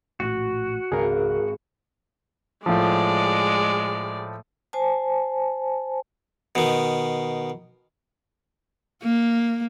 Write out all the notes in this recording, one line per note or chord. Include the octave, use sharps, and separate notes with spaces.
A#1 A2 F#4
G#1 C#2 G#4 A#4 F5
A2 F3 G#3 D5
C5 G#5 A5
B2 D#3
A#3